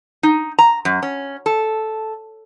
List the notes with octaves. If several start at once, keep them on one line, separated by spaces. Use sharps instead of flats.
D#4
A#5
F#2
C#4
A4